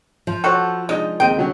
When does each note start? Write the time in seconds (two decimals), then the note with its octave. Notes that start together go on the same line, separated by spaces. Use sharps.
0.27 F3
0.44 F#4 A4 C5 C#5 F#5
0.89 G#3 D4 D#4 D#5
1.20 D#2 G#3 C4 D#5 G5
1.37 D3 F#3 C#4